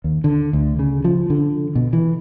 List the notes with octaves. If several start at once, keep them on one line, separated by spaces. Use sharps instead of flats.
D#2
D3
D2
C#3
F3
D3
B2
E3